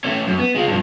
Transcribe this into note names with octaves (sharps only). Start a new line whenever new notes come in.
A3 C#4
F#2
B3
G#3 F4
G2 F3